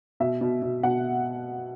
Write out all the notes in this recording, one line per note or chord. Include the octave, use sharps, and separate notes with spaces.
B2 E5
B2
B2
B2 F#5